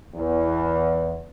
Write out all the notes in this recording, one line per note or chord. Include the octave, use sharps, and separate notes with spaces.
E2